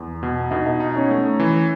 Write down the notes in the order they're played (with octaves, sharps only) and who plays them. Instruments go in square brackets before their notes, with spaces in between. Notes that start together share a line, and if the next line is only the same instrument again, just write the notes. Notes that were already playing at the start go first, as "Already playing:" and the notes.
Already playing: [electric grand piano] E2
B2
[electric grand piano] B2 [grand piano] D#4
[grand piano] D#4
[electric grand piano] D#4
[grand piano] C#4
[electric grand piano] A3
E3